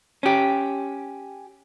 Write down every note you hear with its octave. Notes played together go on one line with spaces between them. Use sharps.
C#4 G4